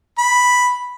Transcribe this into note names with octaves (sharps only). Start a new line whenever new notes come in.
B5